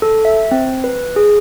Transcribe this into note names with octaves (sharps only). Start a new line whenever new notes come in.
A4
E5
C4
B4
G#4